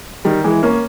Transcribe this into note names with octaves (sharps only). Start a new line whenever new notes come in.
D#3 G3
E3 G#3
A#3 C#4